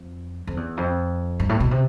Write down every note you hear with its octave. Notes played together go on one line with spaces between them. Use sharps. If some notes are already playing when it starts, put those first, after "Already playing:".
Already playing: F2
F2
E2
F2
G2
A2
B2
C3